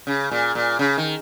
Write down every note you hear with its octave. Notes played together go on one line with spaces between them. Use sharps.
C#3
A#2
A#2
C#3
D#3